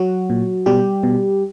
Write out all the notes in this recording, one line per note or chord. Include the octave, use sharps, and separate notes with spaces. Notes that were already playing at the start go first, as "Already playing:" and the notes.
Already playing: F#3 F#4
A#2
B2 G3 G4
B2